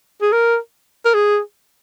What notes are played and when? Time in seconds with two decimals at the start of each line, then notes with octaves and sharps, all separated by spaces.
0.22 G#4
0.32 A#4
1.05 A#4
1.14 G#4